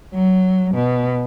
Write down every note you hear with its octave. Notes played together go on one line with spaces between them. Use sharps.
F#3
B2